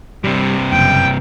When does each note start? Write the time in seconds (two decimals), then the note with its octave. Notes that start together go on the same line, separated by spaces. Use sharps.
0.24 G2 C3 G3
0.73 F#1 G5